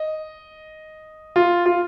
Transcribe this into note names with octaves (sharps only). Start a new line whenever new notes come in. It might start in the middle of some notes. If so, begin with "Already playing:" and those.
Already playing: D#5
F4
F4